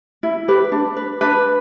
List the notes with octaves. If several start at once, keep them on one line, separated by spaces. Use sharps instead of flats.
E4
G4 B4
D4
B4
D4 B4